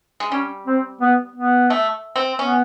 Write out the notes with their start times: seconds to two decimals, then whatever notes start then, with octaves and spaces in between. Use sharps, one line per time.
0.20 G#3
0.32 G3 C#4
0.67 C4
1.01 B3
1.36 B3
1.70 A3
2.16 C4
2.39 B3 C#4